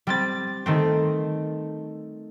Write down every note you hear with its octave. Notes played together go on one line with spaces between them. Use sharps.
G3 C4 A6
D#3 A3 C4